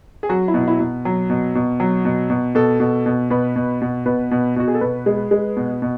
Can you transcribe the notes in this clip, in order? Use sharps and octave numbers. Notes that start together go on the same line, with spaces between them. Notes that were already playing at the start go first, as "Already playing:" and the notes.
G#4
F#3 F#4
E4
B2
E4
B2
F#3
B2
B2
F#3
B2
B2
B2 A4
B2
B2
B2 B4
B2
B2
B2 B4
B2
B2 F#4
G#4
A4
B2 B4
G#3
G#3
B2
B2